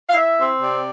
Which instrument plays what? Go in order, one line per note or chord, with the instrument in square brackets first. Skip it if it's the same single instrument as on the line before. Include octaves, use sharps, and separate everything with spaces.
[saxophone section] F5
E4 E5
C4
C3 D5